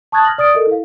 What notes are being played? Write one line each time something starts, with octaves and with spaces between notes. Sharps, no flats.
A5 C#6 D#6 F#6 G#6 A6
F6 A#6 F#7
D5 D#6 A6 D7
A4 A#4 D#5
E4 F5